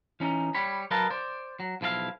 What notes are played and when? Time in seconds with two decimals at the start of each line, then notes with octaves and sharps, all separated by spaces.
0.20 E3 C#4 D#4
0.55 G3 C#5 B5
0.91 F#3 A#4 B4 D#5 F5 A5
1.10 C5 D5
1.60 F#3
1.81 B1 F3 E4 D5 F5